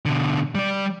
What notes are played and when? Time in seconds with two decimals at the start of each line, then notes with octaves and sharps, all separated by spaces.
0.05 B2 D3
0.55 G3 D5